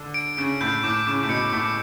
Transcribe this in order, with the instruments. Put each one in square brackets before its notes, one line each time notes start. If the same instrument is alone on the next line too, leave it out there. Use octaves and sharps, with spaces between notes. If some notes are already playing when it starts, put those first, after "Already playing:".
Already playing: [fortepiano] D3
[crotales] D7
[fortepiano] C#3 [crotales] D7
[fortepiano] A2 [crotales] G6
[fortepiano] A2 [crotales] D6
[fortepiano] C#3 [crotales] D6
[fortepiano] A2
[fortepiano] B2 [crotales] C#7
[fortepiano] A2 [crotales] D6